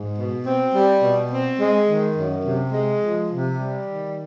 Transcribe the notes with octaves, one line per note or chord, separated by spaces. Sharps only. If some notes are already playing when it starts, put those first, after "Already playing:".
Already playing: G#2
B2
C4
G3
B2
C4
G#3
D#3
F#2
C3
G#3
F3
C3
G3
D#3